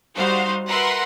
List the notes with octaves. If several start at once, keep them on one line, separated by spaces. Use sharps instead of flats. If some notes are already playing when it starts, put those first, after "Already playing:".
G3 D#4 F#4 C5 F5
A#4 B4 E5 F#5 C6